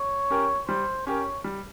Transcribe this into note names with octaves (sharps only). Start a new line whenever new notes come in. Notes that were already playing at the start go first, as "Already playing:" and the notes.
Already playing: C#5
C#4 G4 A#4
G3 C5
C#4 G4 A#4 C#5
G3